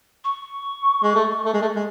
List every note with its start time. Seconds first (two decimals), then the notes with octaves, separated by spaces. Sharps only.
0.24 C#6
1.03 G#3
1.15 A3
1.45 A3
1.53 G#3
1.62 A3
1.75 G#3